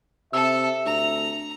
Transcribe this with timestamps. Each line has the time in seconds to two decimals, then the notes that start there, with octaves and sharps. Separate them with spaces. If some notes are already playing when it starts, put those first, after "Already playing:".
0.33 C3 A4 E5 E6
0.86 D2 A#5